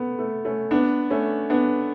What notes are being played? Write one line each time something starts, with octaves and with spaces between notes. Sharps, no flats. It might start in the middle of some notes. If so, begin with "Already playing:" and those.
Already playing: A3 B3
A3
A3 C#4
B3 D4
A3 C#4
B3 D4